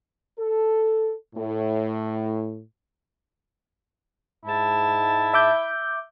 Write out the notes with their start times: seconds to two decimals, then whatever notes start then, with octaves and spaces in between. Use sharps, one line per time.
0.39 A4
1.35 A2
4.46 G#2 E4 A5
5.34 E5 D6 G6